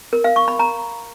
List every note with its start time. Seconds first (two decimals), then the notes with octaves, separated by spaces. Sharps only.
0.13 A#4
0.24 F5
0.36 C#6
0.48 B5
0.59 A#5